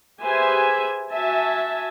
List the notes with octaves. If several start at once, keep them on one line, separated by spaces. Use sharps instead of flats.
G4 G#4 B4 C5 E5 G#5
F#4 E5 G#5 A5